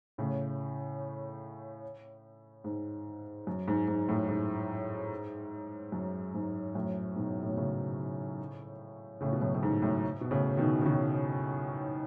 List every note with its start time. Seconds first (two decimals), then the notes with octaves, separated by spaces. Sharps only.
0.18 A2 C#3
2.64 G#2
3.47 F#2
3.68 G#2
3.88 G#2
4.09 F#2 A2
4.29 G#2
5.92 F#2
6.34 G#2
6.74 F#2 A2
7.16 G#2 B2
7.42 A2
7.49 B2
7.57 A2 C#3
9.21 A2 C#3
9.33 B2
9.41 F#2 A2
9.54 A2
9.63 G#2
9.82 F#2 A2
10.21 B2
10.31 A2 C#3
10.57 B2 D#3
10.82 C#3
10.85 B2 D#3